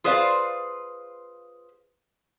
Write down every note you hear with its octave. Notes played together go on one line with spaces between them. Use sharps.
F4 G#4 B4 C5 D5 F5